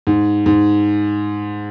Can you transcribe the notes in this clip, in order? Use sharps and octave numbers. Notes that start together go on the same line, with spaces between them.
G#2
G#2